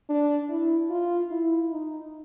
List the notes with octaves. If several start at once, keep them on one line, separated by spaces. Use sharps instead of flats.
D4
E4
F4
E4
D#4